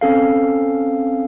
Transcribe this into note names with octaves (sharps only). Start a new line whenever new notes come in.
C4 C#4 A4 F5